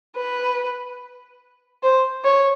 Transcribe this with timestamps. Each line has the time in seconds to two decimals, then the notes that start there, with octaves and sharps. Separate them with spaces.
0.17 B4
1.83 C5
2.24 C#5